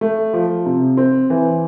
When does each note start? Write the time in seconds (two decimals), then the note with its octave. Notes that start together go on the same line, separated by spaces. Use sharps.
0.01 A3
0.33 F3
0.66 C3
0.97 C4
1.30 E3